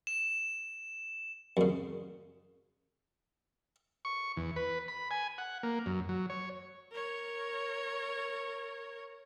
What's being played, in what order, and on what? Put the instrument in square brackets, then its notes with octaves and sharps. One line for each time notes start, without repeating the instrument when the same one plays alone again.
[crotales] E7
[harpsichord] F#2 C#3
[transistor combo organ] C#6
E2
B4
B5
G#5
F#5
A#3
F#2
F#3
C#5
[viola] A#4 C#5